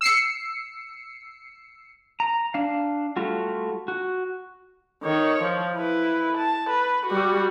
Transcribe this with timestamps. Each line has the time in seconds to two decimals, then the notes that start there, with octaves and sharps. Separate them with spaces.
0.01 E6 C7 C#7
2.20 A#5
2.54 D4 F5
3.17 G3 A3 F4 F#4
3.88 F#4
5.04 D#3 C#5
5.42 F3
5.75 E4 B4
6.37 A5
6.70 B4
7.06 G3 F#4